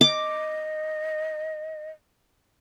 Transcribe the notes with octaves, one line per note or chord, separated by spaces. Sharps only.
D#5 D6